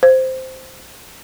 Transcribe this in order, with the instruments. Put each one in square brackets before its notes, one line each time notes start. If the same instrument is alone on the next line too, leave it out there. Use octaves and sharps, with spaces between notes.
[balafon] C5